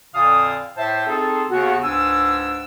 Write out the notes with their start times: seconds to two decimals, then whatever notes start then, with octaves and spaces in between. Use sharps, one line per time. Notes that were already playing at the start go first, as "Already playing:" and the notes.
0.14 F2 A#2 D3 F5 A5 D#6
0.77 A2 C5 E5 A5
1.07 C4 D#4 F4 G#4 A4
1.49 D#2 C#3 B3 F#4
1.83 C#2 G#2 D4 G#5 E6